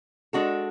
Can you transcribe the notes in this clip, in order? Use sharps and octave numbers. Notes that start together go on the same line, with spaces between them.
G#3 D4 F#4 A4